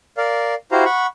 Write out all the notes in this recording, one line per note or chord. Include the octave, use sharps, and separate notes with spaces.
A#4 D5 F5
E4 F#4 G4 C5 F5 A#5
F#5 B5 C#6